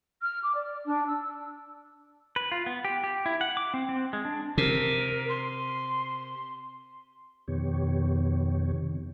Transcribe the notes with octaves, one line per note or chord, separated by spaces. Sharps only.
F6
D6
D5
D4
E6
B4
F4
B3
G4
G4
E4
F#5
D6
C4
C4
G#3
D4
C3 A#4
C6
F2 B2 D#3 B3 G4 C#5
C3 D#3